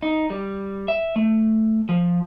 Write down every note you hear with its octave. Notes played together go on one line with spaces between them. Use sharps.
D#4
G3
E5
A3
F3